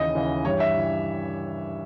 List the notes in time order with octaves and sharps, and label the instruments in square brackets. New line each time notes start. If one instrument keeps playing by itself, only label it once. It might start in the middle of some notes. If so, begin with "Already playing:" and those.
Already playing: [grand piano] D#2 C#3 E3 [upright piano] D#5
[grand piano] D#2 C#3 E3
[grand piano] G2 E3 G3 [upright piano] C#5
[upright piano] E5
[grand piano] E3